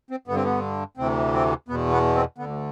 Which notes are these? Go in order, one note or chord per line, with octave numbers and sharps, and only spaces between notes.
C4
G2 D3 B3
C4
B3
D2 C3 E3 C4
C4
E2 B2 B3
B3
C4
D2 D3 B3